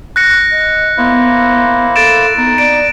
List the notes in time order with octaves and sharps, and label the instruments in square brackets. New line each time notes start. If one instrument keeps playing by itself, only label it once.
[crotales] F#6 A#6 C#7
[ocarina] D#5
[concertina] A#3 E4 C5 [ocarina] B3
[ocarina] A4 [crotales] A6 D7 E7
[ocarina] B3 [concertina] D#4
[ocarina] D5 [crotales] D7